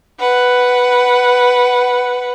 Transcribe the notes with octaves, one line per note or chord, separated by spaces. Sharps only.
B4 F#5